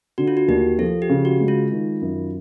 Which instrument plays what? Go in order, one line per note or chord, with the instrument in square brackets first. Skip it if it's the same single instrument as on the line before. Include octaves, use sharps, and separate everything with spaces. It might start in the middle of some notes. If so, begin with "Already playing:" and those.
[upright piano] D3 [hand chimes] F#4
[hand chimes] F4
F#4
[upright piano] D#2 [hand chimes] G4
[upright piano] F3 [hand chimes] A4
[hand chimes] G4
[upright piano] C#3
[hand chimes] F#4
[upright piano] G#3
[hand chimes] F4
[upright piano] D#3
F#2